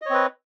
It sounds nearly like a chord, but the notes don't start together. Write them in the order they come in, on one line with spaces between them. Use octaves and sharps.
D#5 C#5 C4 B4